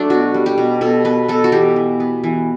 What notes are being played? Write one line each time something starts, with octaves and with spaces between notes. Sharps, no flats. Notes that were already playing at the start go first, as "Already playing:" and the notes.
Already playing: F#3 A3 D4
B2 F#4
G3
G4
B2
B2 A4
B3 B4
B2 A4
F#4
E3 G4
E3
B3
E3